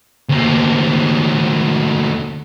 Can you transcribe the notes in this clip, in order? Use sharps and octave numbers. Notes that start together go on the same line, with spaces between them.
D2 A#3